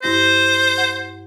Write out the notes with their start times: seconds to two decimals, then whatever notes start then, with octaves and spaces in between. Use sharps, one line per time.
0.03 G2 E4 C5 A#6
0.78 F#5